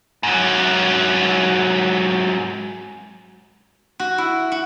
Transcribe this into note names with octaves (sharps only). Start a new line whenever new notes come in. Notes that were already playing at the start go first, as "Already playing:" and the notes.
G#2 F#3
F#4
E4
F#4